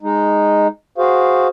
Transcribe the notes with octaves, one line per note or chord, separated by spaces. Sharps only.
G#3 D#4
F#4 G#4 C5 F5